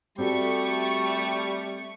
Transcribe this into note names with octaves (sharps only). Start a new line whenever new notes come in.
G3 A3 C4 F#4 A4 C#6